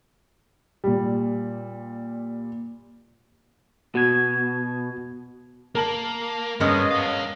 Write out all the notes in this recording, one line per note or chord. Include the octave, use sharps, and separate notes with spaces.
A#2 G3
B2 F#4 G#6
A#3 A#4 A5 F#7
G2 G#3 B3 C#4 C#5 D#5
B4 F5